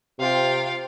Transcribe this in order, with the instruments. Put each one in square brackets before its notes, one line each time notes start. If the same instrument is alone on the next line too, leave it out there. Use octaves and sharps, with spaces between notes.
[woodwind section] C3 [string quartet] F4 F5 G5